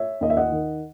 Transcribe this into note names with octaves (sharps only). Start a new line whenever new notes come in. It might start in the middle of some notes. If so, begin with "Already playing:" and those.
Already playing: C#5 E5
D#2 D#5
E5
D#5 F#5
D#3